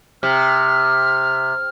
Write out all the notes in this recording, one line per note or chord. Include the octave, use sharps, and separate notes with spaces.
C3 F6